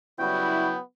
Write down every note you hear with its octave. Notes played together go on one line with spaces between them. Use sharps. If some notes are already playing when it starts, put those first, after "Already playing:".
C#3 F#3 G3 B3 E4 F#4 G5